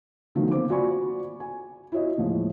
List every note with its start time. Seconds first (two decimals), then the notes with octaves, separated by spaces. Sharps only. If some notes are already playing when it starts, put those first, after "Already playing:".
0.35 D3 D#3 F3 F#3 A3 B3
0.51 A#3 C4 C5 D6
0.68 F4 F#4 D5 G#5 B5 C#6
1.40 G#5
1.92 E4 F#4 C#5 D#5
2.17 D#2 A2 F3 G#3